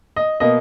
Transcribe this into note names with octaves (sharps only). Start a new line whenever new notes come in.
D#5
B2 A#3 D#5